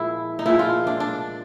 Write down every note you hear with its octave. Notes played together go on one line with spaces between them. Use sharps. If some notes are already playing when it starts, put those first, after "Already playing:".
Already playing: A#2 F3 G#3 E4 G#4
D#4
A#2 F3 G#3 E4
F4
D4
D4